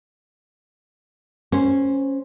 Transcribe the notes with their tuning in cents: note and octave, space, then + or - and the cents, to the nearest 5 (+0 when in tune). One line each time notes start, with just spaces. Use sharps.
C#4 -10 C5 +0